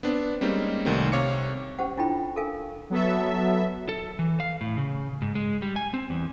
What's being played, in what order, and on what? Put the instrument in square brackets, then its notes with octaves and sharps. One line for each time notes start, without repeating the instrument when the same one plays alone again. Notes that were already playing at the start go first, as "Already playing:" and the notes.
[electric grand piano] B3 C4 D4
G3 G#3 A#3 C4 C#4 D#4
C2 D#3 G3 A3
C3 C#5 F5 D6 C#7
[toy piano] C#4 G4 C5 F#5
D4 E4 F4 A4 G5 B5
D4 A4 A#4 F5 G#5
[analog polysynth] F#3 B3 A4 E5
[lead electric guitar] A4
E3
F5
A2
C#3
G#2
G#3
G3
G#5
C4
E2